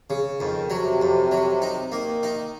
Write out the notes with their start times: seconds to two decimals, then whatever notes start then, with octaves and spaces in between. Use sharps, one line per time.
0.10 C#3
0.40 F2 D#3
0.70 C3 F#3
1.02 F2
1.32 F#3
1.62 D#4
1.92 D#3 A#3
2.23 D#4